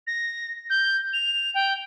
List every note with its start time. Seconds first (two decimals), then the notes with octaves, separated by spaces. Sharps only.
0.07 A#6
0.70 G6
1.13 F7
1.54 G5